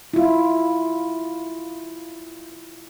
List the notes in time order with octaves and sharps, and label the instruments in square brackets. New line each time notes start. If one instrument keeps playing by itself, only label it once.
[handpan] E4 F4